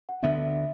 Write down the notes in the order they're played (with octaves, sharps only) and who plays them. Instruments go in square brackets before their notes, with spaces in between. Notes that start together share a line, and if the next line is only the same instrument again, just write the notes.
[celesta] F#5
[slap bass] D2 D3 B3 D4 [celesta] E5